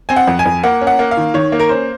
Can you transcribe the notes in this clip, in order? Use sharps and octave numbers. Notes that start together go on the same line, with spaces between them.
C4 G#5
F#5
F2
G#5
F2
A#3 F#5
C#4
F#5
A#3
F5
D#3
D#3 C#5
A#3
A#4
C#4 C5